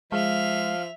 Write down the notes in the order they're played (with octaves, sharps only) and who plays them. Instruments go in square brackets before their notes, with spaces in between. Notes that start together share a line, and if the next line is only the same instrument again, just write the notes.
[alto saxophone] F3 [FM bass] G#3 [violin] E5 F7 [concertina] F5